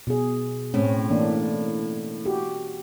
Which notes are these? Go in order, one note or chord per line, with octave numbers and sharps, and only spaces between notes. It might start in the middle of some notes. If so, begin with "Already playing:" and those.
B2 G#4
A2 C4 C#4
E3 A#3 D4
F#4 G4